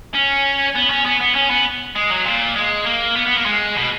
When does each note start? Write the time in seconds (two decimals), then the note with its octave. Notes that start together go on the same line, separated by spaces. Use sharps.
0.15 C#4
0.75 B3
0.90 C#4
1.05 B3
1.20 B3
1.35 C#4
1.50 B3
1.96 G#3
2.10 F#3
2.25 A#2
2.56 G#3
2.86 A#3
3.16 B3
3.27 B3
3.36 A#3
3.46 G#3
3.76 B2